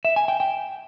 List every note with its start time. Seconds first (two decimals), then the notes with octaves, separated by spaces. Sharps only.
0.05 E5
0.16 G#5
0.28 G5
0.40 G5